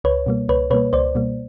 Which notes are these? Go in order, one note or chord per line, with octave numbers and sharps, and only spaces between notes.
C#2 B4 C#5
B2 G3 A#3
C#2 B4 C#5
B2 G3 A#3 B4 C#5
C#2 C5 D5
B2 G3 A#3